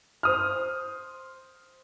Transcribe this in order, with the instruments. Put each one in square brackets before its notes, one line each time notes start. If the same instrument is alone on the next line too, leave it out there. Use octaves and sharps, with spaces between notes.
[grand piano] C5 D#6 F6